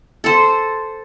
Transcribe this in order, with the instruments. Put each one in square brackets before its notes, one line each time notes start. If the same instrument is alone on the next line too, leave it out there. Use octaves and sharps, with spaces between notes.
[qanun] A4 C5